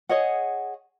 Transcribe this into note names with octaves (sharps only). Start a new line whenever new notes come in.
G#4 C#5 D#5 F#5